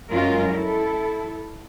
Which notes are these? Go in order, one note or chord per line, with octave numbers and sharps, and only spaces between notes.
F#2 F#3 G#3 C#4 F4 A#4
E4 A4